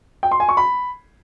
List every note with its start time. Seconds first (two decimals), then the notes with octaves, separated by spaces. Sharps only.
0.23 G5
0.31 C6
0.40 G#5
0.49 C#6
0.57 B5